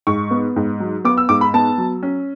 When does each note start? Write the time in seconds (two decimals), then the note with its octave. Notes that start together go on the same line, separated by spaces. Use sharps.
0.07 G#2 C#6
0.31 B3
0.56 G#2
0.80 F#3
1.05 B3 D6
1.17 E6
1.29 G#2 D6
1.41 B5
1.54 B3 A5
1.78 F#3
2.03 C#4